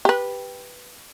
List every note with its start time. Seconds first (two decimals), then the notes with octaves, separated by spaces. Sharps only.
0.05 G4 B4